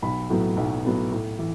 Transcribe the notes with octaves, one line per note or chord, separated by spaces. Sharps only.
B1 B5
A2 F#3 B3
B1
A2 F#3 B3
A2
E3